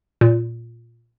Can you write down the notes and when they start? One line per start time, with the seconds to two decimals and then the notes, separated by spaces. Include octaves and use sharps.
0.21 A#2